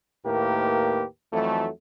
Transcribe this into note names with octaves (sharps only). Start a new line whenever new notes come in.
D#2 A2 A#3 G4 A#4 B4
F2 E3 F#3 A3